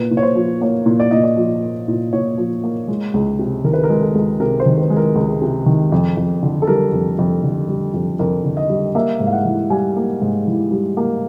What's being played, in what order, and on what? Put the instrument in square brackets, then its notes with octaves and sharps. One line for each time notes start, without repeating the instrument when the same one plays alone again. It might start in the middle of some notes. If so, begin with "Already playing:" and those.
Already playing: [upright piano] A#2 B4
A#2
C#5
C5
F3
A#3 C#5
A#2
D5
A#2 D#5
D5
F3
A#3
A#2
A#2 C#5
F3
A#3
G#3
C#2
C3
D#3 A#4
B4
A#4
G#3
A4
C#2
C3 A#4
C5
D#3
B4
G#3
A#4
C#2
C3
D#3
F2
F2
D3
A4
G3 A#4
F2
F2
D3
G3
F2
F2 A#4
D3
D#5
G3
A#3 E5
G#2
F5
F#5
E3
G3 G#5
A#3
G#2
E3
G3
A#3